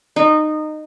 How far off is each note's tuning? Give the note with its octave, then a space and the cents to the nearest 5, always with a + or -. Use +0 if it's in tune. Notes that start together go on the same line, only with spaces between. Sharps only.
D#4 -20